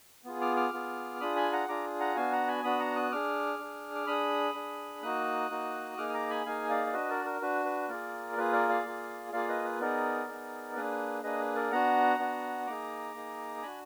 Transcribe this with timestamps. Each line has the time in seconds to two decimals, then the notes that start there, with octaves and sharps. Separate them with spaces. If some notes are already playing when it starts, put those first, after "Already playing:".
0.25 B3 F4 G#4
0.41 D6 F6
0.56 D6 F6
0.73 B3 F4 G#4
1.20 D4 F4 G#4 B5 D#6
1.36 G#5 B5
1.52 F#5 A#5
1.68 D4 F4 G#4 A#5 D6
2.00 F#5 A#5
2.16 B3 D4 F#4 F5 G#5
2.32 F#5 A#5
2.47 G#5 B5
2.64 B3 D4 F#4 B5 D#6
2.80 F#5 A#5
2.96 D#6 F#6
3.12 D4 G#4 D6 F6
3.59 D4 G#4
3.95 D6
4.07 D4 G#4 B5 D#6
4.54 D4 G#4
5.02 A#3 D#4 F#4 D#6 F#6
5.51 A#3 D#4 F#4
5.98 A#3 D#4 G#4 D6 F6
6.09 D#6
6.14 A#5 D6
6.30 G#5 B5
6.46 A#3 D#4 G#4 F5 G#5
6.70 D5 F5
6.86 D5
6.93 D4 F#4 B4 D#5
7.09 A#4 D5
7.25 A#4
7.41 D4 F#4 B4
7.65 B4
7.89 A#3 F4 G#4 A#4 D5
8.36 A#3 F4 G#4 B4
8.53 A#4 D5
8.69 D5 F5
8.84 A#3 F4 G#4
9.32 A#3 F4 G#4 D5 F5
9.48 B4 D#5
9.65 B4
9.80 B3 D#4 G#4 A#4 D5
10.28 B3 D#4 G#4
10.76 A#3 D4 G#4 B4
11.23 A#3 D4 G#4 B4 D#5
11.39 B4
11.55 A#4 D5
11.71 B3 D4 F#4 F#5 A#5
12.19 B3 D4 F#4
12.66 A#3 D#4 G#4 A#5 D6
13.14 A#3 D#4 G#4
13.62 D4 F#4 G#5 B5